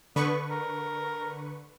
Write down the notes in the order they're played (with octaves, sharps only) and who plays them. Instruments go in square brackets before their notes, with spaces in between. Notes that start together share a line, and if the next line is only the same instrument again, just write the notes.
[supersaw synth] D3 B4 C#6 [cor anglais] B3
[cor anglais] A#4